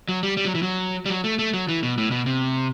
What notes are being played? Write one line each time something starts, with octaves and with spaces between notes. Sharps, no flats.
F#3
G3
G3
F#3
E3
F#3
G3
F#3
A3
A3
F#3
E3
B2
A2
B2
C3